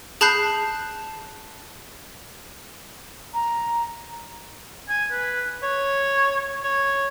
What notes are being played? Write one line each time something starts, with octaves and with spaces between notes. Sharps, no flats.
G#4 A5 B5 F#6 G6 C7
A#5
G#5
B4
C#5
C#5